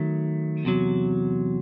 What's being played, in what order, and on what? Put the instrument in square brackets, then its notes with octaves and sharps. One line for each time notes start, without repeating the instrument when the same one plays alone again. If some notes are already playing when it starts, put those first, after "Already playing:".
Already playing: [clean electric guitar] D#3 F#3 A3
E2 C3 F#3